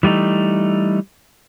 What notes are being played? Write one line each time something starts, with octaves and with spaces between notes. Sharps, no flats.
E3 G3 A3 D#4